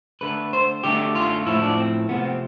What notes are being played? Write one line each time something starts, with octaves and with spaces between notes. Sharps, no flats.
D3 A3 B4
C5
D3 A3 G4
F4
A2 F3 A3 E4
D4
C4
C3 F3 A3 B3
C4